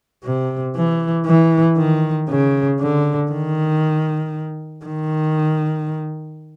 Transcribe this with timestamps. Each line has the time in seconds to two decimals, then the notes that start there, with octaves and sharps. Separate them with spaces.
0.24 C3
0.75 E3
1.26 E3
1.77 D#3
2.29 C#3
2.80 D3
3.32 D#3
4.85 D#3